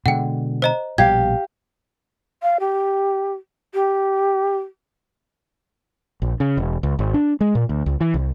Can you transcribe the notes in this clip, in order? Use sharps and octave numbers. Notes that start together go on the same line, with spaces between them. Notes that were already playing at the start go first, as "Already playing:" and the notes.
B2 D3 G#3 F#5 G5
C5 D#5 A#5
A#1 B2 G3 G4 F5 G#6
F5
G4
G4
A#1
C#3
E1
C#2
G#1
D4
G#3
A#2
D2
C#2
E3
C2